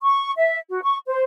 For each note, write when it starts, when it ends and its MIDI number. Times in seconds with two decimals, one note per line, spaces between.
0.02 0.32 85
0.37 0.57 76
0.69 0.81 66
0.83 0.97 85
1.06 1.24 72